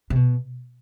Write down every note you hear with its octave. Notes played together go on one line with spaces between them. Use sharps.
C3
B2